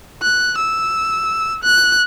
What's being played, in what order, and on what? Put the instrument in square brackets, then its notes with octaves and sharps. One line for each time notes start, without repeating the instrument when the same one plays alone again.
[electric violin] F#6
E6
F#6